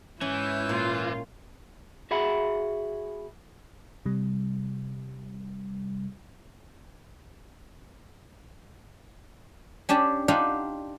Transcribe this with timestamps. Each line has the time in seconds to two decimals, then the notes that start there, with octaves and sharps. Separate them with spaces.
0.21 G#2 E3 C#4 E4 G6
0.69 A#2 F4
2.11 F#4 G#4 E5 F#5 B5
4.06 C3 G3
9.89 C#4 D4 G4 A5
10.28 D4 D#4 F4 G4 F5 F#5